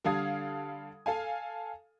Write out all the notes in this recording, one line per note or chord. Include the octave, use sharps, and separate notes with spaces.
D3 G3 A4 F5 D#6 G#6
A4 F5 G#5